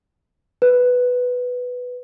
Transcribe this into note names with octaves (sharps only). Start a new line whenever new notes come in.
B4